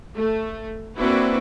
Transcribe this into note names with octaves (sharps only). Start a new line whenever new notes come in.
A3
A#3 C4 D4 E4 F#4 B4